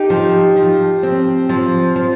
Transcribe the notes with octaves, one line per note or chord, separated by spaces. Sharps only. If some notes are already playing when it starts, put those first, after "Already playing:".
Already playing: D#4 G4
F3
F3
C4
F3
F3